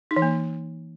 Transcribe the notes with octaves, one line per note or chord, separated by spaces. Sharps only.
D#4
E3
A#3